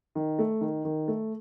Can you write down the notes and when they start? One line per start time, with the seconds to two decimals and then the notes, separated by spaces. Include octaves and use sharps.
0.15 D#3
0.39 A3
0.61 D#3
0.85 D#3
1.08 A3